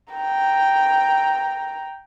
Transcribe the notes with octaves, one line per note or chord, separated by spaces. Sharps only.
G5 A#5